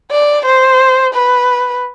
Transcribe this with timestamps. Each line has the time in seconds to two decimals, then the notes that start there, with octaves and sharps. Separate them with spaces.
0.11 D5
0.46 C5
1.14 B4